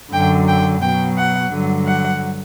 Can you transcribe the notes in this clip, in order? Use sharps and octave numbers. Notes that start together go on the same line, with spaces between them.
F#2 D3 F#3 G5
G5
B2 F#3 G5
F#5
G2 D3 F#3
F#5